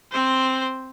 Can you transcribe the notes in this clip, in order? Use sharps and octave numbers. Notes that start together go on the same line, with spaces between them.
C4 C5